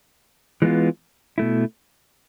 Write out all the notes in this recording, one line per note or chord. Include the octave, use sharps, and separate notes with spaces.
E3 G#3 B3 F4
B2 A3 E4